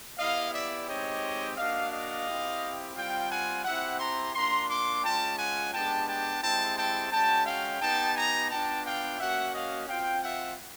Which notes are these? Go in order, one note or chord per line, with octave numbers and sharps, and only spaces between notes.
B3 E4 G4 D#5 F5
D5 E5
G#3 C4 D#4 G4 C#5 D#5
A#3 D4 F#4 D#5 F5
D#5 F5
C4 E4 G4
G3 C4 F4 F5 G5
F#5 G#5
C4 E4 G4 E5 F#5
A#5 C6
A#3 D4 F4 A#5 C6
C6 D6
G#3 C#4 F4 G5 A5
F#5 G#5
G#3 B3 D4 G4 G5 A5
G5 A5
G#3 C4 E4 G4 G5 A5
G5 A5
G#3 C#4 F#4 G5 A5
F5 G5
B3 D#4 G4 G5 A5
G#5 A#5
B3 D4 F4 G5 A5
F5 G5
A#3 C#4 F#4 E5 F#5
D#5 F5
C4 F4 F5 G5
E5 F#5